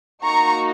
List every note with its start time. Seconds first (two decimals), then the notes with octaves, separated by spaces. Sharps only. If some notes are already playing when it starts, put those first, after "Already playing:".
0.25 A#3 D#4 F#4 A#5 C#6